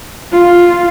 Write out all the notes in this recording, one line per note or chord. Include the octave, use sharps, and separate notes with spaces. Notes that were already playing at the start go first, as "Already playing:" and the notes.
F4